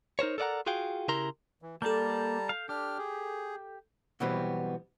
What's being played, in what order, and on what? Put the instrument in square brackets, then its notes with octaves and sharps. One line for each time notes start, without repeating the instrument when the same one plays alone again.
[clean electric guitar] D#4 A#4 C5 C#5
A4 A#4 D5 D#5 F#5 A#5
F4 F#4 G#4 F5 G5
C#3 E4 G4 A#4 A#5 C6
[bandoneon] E3
[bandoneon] G3 A5 A#5 [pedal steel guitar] A#3 D5 [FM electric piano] A4 G6
[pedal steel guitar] F5
[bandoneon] D4 F6 [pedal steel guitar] G4
[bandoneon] G#4
[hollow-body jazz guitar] B2 E3 F#3 G3 B3 C4